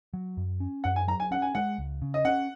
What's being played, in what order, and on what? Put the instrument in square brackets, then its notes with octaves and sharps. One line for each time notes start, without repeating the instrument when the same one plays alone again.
[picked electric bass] F#3
F#2
C#4
[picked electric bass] F#2 [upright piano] F#5
[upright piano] G#5
[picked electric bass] F#3 [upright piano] A#5
[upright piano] G#5
[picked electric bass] C#4 [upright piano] F#5
[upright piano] G#5
[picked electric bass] G#3 [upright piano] F#5
[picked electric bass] C#2
C#3
[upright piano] D#5
[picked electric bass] C#4 [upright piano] F#5